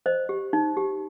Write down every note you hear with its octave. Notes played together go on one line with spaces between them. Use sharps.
C5 D#5
G4
D#4
G4